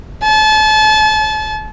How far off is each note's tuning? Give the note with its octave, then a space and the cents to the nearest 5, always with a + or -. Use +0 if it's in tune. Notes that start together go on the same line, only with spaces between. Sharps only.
A5 -35